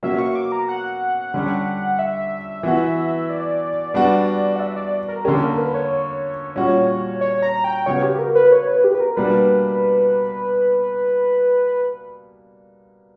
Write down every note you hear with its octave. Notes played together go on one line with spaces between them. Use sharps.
B2 F#3 A#3 C#4 E5
C#6
D6
A#5
F#5
D3 G3 C#4 G4
E5
E3 B3 F#4
D5
G3 B3 D4 F#4
F#5
E5
D5
A#4
D3 A#3 C#4 G4
A#4
B4
C#5
A#2 G3 C#4 F#4
C#5
A#5
G5
C#3 F#3 B3 F#4 C#5
G4
A#4
B4
C#5
B4
G4
B4
A#4
B2 G3 A#3 D4 B4